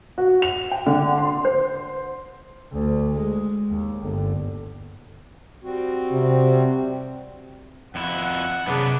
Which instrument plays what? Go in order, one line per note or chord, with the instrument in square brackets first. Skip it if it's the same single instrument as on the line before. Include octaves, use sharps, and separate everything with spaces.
[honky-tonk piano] F#4
F7
G5
D3
C6
C5
[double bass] D2
G#3
D#2
G1
[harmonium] G3 C4 F#4
[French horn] C3
[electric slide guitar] F2 E4 [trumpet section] F#5
[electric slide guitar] F#2 B3 [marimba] C3 G#4 [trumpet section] D4 B4